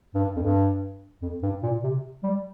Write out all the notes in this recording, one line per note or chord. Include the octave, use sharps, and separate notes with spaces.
G2
F2
G2
F2
G2
A#2
C3
G3